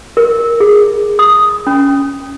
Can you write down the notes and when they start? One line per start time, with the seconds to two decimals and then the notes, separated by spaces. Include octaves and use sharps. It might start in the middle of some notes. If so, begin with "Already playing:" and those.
0.17 A#4
0.60 G#4
1.19 D#6
1.67 C#4